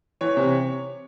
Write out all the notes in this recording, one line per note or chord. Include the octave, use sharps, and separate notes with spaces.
E3 C#5
C3